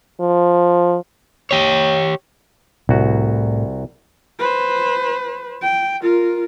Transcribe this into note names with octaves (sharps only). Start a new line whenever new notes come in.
F3
G4 C#5
C2 A2 F#4
B4 C5
G5
F4 A#4